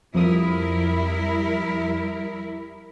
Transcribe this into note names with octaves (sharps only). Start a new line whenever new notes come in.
F2 F3 G3 E4 A#4 D#6